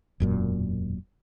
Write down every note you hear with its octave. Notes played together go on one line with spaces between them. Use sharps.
E1 F#2 A#2